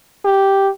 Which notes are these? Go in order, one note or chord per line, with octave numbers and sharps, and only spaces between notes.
G4